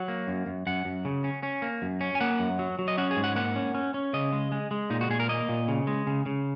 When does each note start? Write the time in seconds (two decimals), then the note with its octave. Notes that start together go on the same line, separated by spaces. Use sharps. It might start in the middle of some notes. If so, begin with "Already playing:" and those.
Already playing: F#3 F#5
0.08 A#3
0.27 F#2
0.46 F#2
0.67 F#2 F#5
0.85 F#2
1.05 C#3
1.24 C#4
1.43 C#4
1.62 A#3
1.82 F#2
2.01 C#4
2.15 G#5
2.21 A#3 F#5
2.39 F#2
2.59 F#3
2.79 F#3
2.88 D#5
2.98 C#4 F#5
3.11 G#4
3.16 G#2
3.24 F#5
3.36 A#3 F#5
3.56 C#4
3.74 C#4
3.94 C#4
4.13 C#3 D#5
4.33 G#3
4.52 G#3
4.71 G#3
4.90 A#2 D#4
5.01 F#4
5.10 A#2 G#4
5.20 A#4
5.29 A#3 D#5
5.49 A#2
5.68 C#3
5.87 G#3
6.07 C#3
6.26 C#3